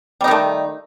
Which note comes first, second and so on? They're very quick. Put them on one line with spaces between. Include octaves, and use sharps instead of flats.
G3 D#4 D#3 A3